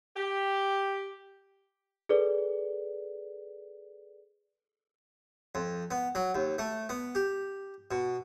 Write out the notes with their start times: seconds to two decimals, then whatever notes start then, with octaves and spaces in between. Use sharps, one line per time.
0.16 G4
2.09 G#4 A4 B4 D5
5.55 F2
5.91 B3
6.15 F#3
6.35 D#2
6.58 A3
6.89 B3
7.15 G4
7.91 B2